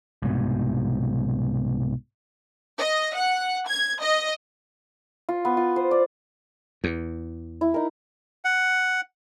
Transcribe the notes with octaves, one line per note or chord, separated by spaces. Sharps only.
C2 G#2 B2
D#5
F#5
G#6
D#5
F4
B3
F4
C5
D5
E2
E4
D#4 A#4
F#5